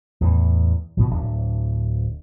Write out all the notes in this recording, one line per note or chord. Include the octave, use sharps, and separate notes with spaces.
E2 A2 E3
A#2 F3
D1 D4